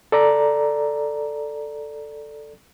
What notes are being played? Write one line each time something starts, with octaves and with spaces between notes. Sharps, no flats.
A4 D5 A#5